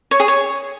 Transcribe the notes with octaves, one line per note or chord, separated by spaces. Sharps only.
C#5
G#4
C#5